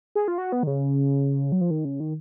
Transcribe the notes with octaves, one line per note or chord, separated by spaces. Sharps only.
G#4
F4
F#4
B3
D#3
C#3
F#3
F3
D#3
C#3
D#3